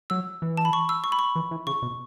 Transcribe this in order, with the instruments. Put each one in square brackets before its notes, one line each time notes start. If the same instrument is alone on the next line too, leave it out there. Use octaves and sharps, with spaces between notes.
[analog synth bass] F#3 [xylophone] E6
[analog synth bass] E3
[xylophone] A5
B5
C#6
E6
C#6
B5
C#6
[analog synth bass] E3
E3
[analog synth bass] C#3 [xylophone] C#6
[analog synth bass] B2